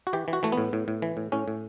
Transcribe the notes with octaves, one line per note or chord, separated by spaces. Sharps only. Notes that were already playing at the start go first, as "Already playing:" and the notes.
F#4
E3 G4
E3
F#4
E3 A3
B3
A2
A2
A2
E3
A2
A2 C#4
A2